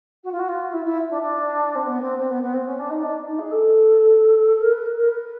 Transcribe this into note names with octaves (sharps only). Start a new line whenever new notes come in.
F#4
F4
F#4
F4
E4
E4
D4
D4
C4
B3
C4
C4
B3
B3
C4
C#4
D4
D#4
D4
D#4
G#4
A4
A#4
B4
A#4
A#4
B4